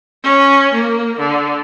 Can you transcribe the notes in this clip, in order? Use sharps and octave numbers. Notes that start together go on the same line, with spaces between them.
C#4
A#3
D3